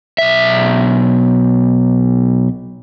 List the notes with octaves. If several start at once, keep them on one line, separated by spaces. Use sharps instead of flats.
B1 E5